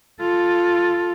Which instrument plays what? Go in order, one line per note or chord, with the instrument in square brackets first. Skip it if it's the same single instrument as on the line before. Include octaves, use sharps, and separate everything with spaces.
[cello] F4 A4